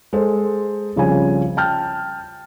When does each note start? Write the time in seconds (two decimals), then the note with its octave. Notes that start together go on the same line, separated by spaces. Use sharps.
0.13 G#3 A4 C5
0.96 C2 C#3 F3 C#4 G#5
1.57 G5 A5 F6 G6